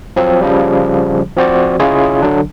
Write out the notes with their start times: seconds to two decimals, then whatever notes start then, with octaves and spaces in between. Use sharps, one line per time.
0.16 F3 F#3 C4
0.41 C#3 F3 G3
1.37 F3 C4 F#4 C5 D5
1.80 C#3 E4 F4 G#4 C#5 D#5
2.22 D3 F#3 D4